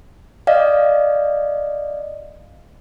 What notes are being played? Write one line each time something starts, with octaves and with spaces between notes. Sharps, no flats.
D5 D#5 F5